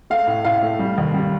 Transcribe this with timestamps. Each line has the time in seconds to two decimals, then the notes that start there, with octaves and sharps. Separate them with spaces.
0.10 A3 F5
0.27 A2
0.44 A2 F5
0.63 A3
0.79 G3
0.98 D#2
1.14 G3